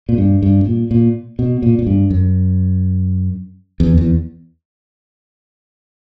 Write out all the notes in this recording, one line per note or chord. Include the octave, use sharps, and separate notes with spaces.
A#2
G2
G2
A#2
A#2
B2
A#2
A#2
G2
F#2
E2
E2